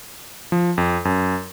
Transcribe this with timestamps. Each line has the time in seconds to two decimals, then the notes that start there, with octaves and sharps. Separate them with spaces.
0.52 F3
0.78 F2
1.05 F#2